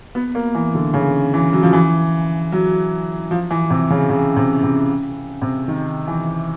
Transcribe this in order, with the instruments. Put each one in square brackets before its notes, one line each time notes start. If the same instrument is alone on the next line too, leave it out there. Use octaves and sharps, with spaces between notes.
[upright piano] B3
A#3
E3
D3
C#3
E3
F#3
F3
E3
F#3
F3
E3
C3
C#3
C#3
C3
C3
C3
D#3
E3